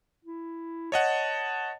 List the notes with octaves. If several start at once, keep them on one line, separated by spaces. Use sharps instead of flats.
E4
C#5 D#5 F#5 A5